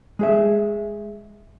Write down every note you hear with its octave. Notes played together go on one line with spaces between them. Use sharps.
G#3 G#4 E5